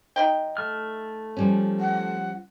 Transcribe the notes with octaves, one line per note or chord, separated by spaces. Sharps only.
F#3 D#4 G5
A3 F6
F3 G3 C#4
F#5